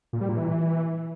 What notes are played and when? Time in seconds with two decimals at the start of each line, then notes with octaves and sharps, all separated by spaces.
0.13 A#2
0.21 G3
0.29 A#2
0.37 E3